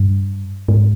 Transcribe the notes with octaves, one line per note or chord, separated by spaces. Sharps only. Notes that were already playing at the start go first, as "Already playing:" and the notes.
Already playing: G2
G#2